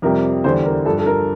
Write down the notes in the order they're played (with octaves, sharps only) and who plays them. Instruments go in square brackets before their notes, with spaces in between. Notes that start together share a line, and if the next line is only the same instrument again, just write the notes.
[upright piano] F2 C3 G3 A#4
E2 D3 G3 C5
A#4
G2 F3 A4
A4
A#4